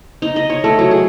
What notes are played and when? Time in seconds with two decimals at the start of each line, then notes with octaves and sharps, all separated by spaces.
0.22 D#4
0.36 D#5
0.50 C#5
0.64 A3
0.79 F#3
0.91 G#4